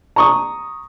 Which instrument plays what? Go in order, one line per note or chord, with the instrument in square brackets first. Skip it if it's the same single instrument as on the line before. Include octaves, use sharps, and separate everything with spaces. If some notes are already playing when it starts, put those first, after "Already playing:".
[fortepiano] A#5 C#6 D#6